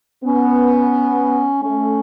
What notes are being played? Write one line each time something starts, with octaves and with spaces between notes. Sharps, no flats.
B3 C#4
A3 C#4